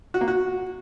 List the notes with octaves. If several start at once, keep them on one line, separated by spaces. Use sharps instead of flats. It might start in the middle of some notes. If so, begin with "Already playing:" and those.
F#4
A#3
F#4